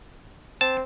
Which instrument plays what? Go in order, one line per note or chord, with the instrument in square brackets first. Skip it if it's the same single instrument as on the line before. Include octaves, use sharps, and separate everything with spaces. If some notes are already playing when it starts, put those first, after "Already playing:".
[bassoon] C4 [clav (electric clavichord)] A5